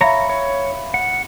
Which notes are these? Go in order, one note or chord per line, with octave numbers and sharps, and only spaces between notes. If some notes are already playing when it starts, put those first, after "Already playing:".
C#5 E5 F5 A#5 B5
C#5
F#5